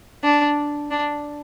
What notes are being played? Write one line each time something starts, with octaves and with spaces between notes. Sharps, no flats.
D4
D4